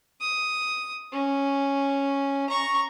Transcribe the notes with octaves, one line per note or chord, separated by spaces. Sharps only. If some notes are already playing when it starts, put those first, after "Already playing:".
D#6
C#4
A#5 C#6